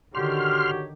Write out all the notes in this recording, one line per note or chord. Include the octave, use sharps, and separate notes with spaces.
D3 D#3 F#4 G4 C#5 C6 F6